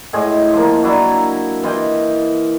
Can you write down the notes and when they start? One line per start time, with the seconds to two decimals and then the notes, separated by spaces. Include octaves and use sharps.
0.13 A2 G#3 D#5 G#5
0.53 F3 A#3
0.83 F#3 D4 E4
1.63 E3 F4 D#5 G5